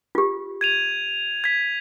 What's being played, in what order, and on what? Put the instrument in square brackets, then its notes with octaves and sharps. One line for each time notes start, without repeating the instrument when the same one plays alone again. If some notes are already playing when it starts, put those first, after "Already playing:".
[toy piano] F4 G4
[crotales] G#6 D#7 F7
G#6 B6